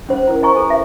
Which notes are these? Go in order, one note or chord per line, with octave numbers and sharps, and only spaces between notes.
C#4 C5
E4 A#4
C5 D#5 G#5 A#5 C#6
A4 B4
E5